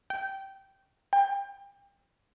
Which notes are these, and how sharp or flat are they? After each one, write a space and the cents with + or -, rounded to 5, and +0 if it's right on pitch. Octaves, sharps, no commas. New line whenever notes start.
G5 -15
G5 +30